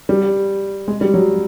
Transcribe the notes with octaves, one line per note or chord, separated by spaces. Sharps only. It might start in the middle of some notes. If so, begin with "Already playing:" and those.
G3
G#3
G3
F#3